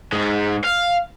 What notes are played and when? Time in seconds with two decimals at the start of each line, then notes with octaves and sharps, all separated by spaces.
0.12 G#2 G#3
0.64 F5